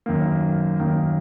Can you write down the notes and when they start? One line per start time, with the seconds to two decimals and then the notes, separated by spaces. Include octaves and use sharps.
0.06 F#2 D#3 A#3
0.79 F#2 D#3 A#3